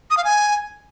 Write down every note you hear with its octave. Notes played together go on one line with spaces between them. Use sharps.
D#6
F5
G#5